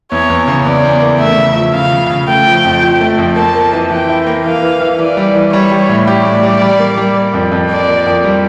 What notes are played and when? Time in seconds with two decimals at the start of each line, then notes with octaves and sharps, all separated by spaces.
0.11 E2 C#5
0.30 E2
0.48 C#3
0.65 E2 D5
0.84 E2
1.02 A#3
1.19 A3 E5
1.38 C#3
1.56 F3
1.74 C#3 F5
1.92 C#3
2.10 C#3
2.28 A3 G5
2.47 F3
2.65 F2
2.82 F3
3.01 A3
3.18 F2
3.36 A#3 A5
3.55 A#3
3.73 E3
3.91 E3 G5
4.09 E4
4.27 A#3
4.45 E3 F5
4.63 E3
4.81 E3
4.99 E3 D5
5.17 G3
5.35 E3
5.53 G3 C#5
5.71 G3
5.89 A2
6.07 G4 D5
6.25 A2
6.43 G3
6.61 G3
6.79 A#3
6.97 G3
7.16 A#3
7.34 F2
7.51 F2
7.70 A#3 D5
7.88 A#3
8.06 F2
8.24 G3